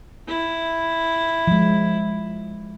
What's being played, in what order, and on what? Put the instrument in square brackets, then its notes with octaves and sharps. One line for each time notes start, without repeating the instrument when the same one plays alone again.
[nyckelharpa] E4
[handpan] F3 G#3